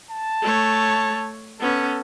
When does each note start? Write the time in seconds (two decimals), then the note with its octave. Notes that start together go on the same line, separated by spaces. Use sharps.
0.11 A5
0.42 A3 C#5
1.60 B3 C#4 A4